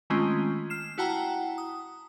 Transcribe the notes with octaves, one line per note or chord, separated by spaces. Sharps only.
D#3 G#3 A3 C4 C#4 F4
F6 C7 E7
E4 F#4 F#5 G5 A5 A#5
D#6